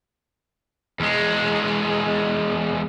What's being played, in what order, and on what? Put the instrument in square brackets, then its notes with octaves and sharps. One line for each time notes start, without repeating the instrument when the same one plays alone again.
[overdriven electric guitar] E2 G#3